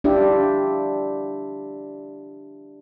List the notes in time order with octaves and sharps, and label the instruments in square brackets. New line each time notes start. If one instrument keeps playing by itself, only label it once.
[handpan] D4 E4 F4 G4 D5 E5